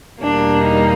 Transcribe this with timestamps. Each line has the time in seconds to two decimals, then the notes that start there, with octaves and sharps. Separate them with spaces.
0.22 E2 B2 G3 A#3 D4
0.63 D#4